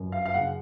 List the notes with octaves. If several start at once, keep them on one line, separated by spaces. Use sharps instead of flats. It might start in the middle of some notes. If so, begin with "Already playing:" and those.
Already playing: G1 F#2
F5
F5
C#3 F#5